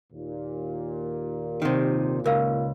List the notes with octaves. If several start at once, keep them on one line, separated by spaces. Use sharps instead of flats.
D#2 A#2
C3 D#3
C#2 A#4 F5